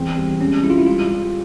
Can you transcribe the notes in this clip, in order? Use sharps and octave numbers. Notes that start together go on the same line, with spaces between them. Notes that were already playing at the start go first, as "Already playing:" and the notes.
Already playing: E2 C4
G3
G#3 C#4
G#3 E4
F4
E4
G3 F4
G3